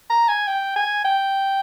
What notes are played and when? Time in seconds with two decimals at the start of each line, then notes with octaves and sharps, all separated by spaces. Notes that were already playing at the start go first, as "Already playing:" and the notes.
0.10 A#5
0.29 G#5
0.47 G5
0.76 G#5
1.05 G5